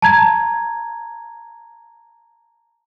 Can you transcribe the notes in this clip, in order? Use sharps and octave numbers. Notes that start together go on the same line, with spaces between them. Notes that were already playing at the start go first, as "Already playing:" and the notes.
A5 A#5 G#6